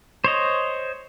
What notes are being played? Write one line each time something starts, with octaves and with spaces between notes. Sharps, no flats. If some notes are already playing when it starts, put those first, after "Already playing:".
C5 C#5 D#5